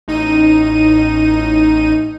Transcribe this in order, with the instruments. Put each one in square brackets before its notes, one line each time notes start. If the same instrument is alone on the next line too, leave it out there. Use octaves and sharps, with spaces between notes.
[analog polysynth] A1 D#4 D#7